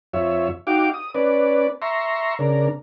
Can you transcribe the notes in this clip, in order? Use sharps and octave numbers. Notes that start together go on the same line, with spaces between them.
F2 F4 C#5 E5
D#4 F#4 F5 G5 D6
D#6
C#4 B4 D5
E5 A#5 C6 C#6
C#3 D4 A#4